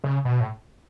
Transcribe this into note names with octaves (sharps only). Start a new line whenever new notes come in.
C#3
B2
A2